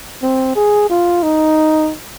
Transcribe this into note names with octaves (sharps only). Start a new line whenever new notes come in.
C4
G#4
F4
D#4